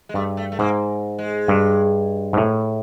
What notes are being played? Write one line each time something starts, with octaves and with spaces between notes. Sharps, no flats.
G#3
G2 A3
A3
A3
G#2 A#3
G#3
G2
G#2
A2